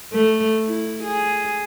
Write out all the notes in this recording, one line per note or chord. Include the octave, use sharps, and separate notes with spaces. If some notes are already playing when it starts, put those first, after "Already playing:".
A3
E4
G#4